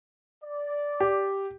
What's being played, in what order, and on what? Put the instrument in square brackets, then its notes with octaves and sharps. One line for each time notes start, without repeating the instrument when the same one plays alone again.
[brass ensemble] D5
[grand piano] G4